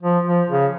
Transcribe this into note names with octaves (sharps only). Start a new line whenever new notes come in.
F3
F3
C#3